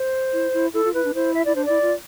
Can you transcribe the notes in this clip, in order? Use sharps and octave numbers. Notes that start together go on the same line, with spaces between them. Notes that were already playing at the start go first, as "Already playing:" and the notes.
Already playing: C5
E4
E4
E4 A4
F4
E4 B4
D4
E4 C5
E5
E4 D5
D4 C5
E4 D5
F4